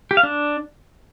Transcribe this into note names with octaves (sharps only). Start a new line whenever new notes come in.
G4
F5
D4